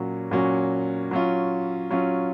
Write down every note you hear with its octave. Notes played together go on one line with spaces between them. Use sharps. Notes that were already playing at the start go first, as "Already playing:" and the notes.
Already playing: A#2 F#3 C#4 F#4
A#2 F#3 C#4 F#4
F#3 C#4 F4
F#3 C#4 F4